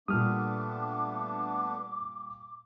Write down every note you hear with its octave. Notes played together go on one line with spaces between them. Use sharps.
A#2 G3 A3 B3 D4 D6 D#6 F6